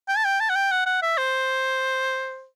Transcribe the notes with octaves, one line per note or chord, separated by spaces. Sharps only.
G5
A5
G5
A5
F#5
G5
F#5
F#5
E5
C5